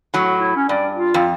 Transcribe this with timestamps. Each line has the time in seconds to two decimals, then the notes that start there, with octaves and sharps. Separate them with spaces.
0.14 A2 F#3
0.39 E4
0.56 C#4
0.69 G2 D5
0.94 F4
1.14 F2